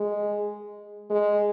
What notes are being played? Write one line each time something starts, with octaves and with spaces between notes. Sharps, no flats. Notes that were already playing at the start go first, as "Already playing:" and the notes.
Already playing: G#3
G#3